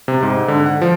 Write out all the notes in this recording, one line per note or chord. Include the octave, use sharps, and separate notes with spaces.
C3
G#2
D3
F#5
F3